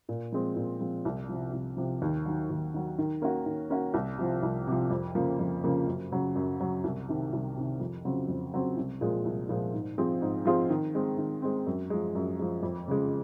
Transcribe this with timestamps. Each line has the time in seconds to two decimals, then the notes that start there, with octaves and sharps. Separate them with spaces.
0.09 A#2
0.32 F3 G#3 C4
0.56 A#2
0.80 F3 G#3 C4
1.05 C2
1.29 C3 F3
1.53 C2
1.77 C3 F3
2.02 D#2
2.26 D#3 F#3
2.50 D#2
2.74 D#3 F#3
2.98 D#3
3.22 A#3 C#4 F#4
3.46 D#3
3.70 A#3 C#4 F#4
3.94 C2
4.18 C3 F3
4.43 C2
4.67 C3 F3
4.91 F2
5.15 C#3 F3 A#3
5.39 F2
5.64 C#3 F3 A#3
5.87 F#2
6.12 C#3 F#3
6.36 F#2
6.60 C#3 F#3
6.84 C2
7.09 C3 D#3
7.33 C2
7.57 C3 D#3
7.80 F2
8.05 C#3 F#3 C4
8.28 F2
8.53 C#3 F#3 C4
8.77 C2
9.01 A#2 F3 G#3
9.25 C2
9.49 A#2 F3 G#3
9.73 G#2
9.98 F3 C4 F4 G#4
10.22 G#2
10.45 F3 C4 F4 G#4
10.70 D#3
10.95 G#3 C4
11.18 D#3
11.42 G#3 C4
11.67 F#2
11.90 F3 G#3
12.15 F#2
12.39 F3 G#3
12.63 F2
12.88 C#3 G#3